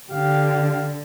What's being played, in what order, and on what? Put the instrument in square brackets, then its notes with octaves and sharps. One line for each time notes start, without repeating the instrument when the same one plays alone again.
[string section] D3 [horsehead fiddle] G4 F5